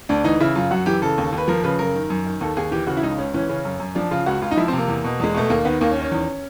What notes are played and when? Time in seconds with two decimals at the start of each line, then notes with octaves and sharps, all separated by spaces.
0.09 D2 D4
0.24 E3 D#4
0.40 C#3 E4
0.55 F#2 F4
0.71 F#2 F#4
0.86 E3 G4
1.02 C#3 A4
1.18 D#2
1.33 D#2 B4
1.48 F3 A#4
1.63 C#3 B4
1.79 F#2 A#4
1.95 D#3
2.10 F#2
2.25 D#3
2.41 D#2 A4
2.57 D#2 G#4
2.71 E3 G4
2.87 C#3 F#4
2.97 E4
3.02 C#2 D#4
3.18 C#2 C#4
3.34 E3 C#4
3.49 C#3 C#4
3.65 F#2
3.80 F#2
3.95 F3 D4
4.11 C#3 F4
4.26 C#2 F#4
4.42 C#2 F4
4.51 D#4
4.57 F3 E4
4.68 C4
4.73 C3 A#3
4.88 E2
5.04 B2
5.20 E2 G#3
5.34 B2 A3
5.50 D#2 A#3
5.65 D#3 B3
5.81 D#2 A#3
5.91 C#4
5.97 D#3
6.02 C#4
6.11 E2